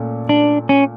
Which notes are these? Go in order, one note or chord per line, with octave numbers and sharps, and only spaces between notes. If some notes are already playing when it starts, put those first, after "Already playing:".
Already playing: A#2 A3 C#4
D4
C#4